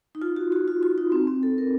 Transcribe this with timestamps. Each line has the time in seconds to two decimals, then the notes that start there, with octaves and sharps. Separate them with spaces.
0.15 D#4
0.22 F4
0.36 F#4
0.52 F#4
0.68 F4
0.83 F4
0.98 D#4
1.12 C4
1.27 C4
1.43 A4
1.58 A#4